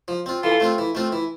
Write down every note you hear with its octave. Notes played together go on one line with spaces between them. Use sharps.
F3
C4 F4
E3 F4 A4
A3 C4 F4
E3
A3 C4 F4
E3